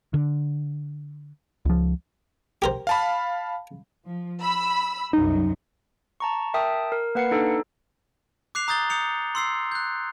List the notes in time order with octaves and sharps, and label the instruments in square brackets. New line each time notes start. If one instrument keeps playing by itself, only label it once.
[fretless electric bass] D3
[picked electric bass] C#2 F3
[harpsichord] G4 A#4 C5
[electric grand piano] F5 A5 B5
[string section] F3
B5 E6
[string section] C2 F#2 F#3 [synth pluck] D#4
[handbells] A5 A#5 C#6
A#4 E5 G5 A5 D#6
A#4
A#3 B4 F#5 C7 C#7
D4 D#4 A4
[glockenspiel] D6 F#6 C7 F7
A#5 D#6 G6 A6 G7
D#6 G6 C#7 F7
C6 E6 C7
F#6 G6